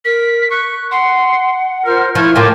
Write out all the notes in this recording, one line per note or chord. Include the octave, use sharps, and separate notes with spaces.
A#4 B6
C#6 F#6
F#5 C6
F4 A#4 C5 F6
F3 E4 C#6 F6
A2 A#3 F4 G5 A5 D6